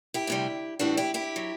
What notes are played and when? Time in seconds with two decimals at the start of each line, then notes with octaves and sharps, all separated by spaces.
0.14 E4 G4
0.27 D2 C3 G3
0.79 A2 E3 G3 D4 F#4
0.97 E4 G4
1.14 E4 G4
1.36 F#3